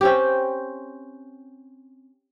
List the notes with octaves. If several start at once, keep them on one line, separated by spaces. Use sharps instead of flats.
C4 C#4 G4